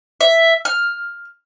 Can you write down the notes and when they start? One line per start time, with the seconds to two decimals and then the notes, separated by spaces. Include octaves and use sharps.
0.21 E5
0.65 F6